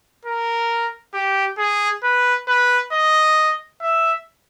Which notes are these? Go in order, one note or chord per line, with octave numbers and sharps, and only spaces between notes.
A#4
G4
G#4
B4
B4
D#5
E5